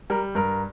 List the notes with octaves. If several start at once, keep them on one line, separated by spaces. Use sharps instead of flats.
G3 A#4
G2 A#4